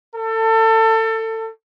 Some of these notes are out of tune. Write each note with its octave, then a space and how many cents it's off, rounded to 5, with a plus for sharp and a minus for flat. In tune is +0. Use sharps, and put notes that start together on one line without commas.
A4 +25